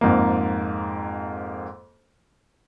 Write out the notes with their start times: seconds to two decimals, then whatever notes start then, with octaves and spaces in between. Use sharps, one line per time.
0.01 F2 G#2 A#3